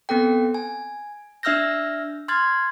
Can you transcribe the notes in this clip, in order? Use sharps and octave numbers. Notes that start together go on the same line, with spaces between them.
B3 C4 A4 G5
G#5
D4 E5 E6 F6 G6 A#6
C6 F6 G#6 A6